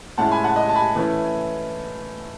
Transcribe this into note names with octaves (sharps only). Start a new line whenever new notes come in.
A2 G#3 C#4 E4 F#5 A5
G#5 B5
F#5 A5
D#5
A5
G#5 B5
E3 A3 C#4 E4